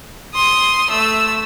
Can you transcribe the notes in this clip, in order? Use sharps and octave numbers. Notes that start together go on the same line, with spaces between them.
C6 D#6
A3 E6